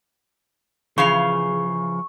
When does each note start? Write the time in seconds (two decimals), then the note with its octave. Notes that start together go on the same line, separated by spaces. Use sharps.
0.98 C#3 E3 F3 G#4 F5 C#6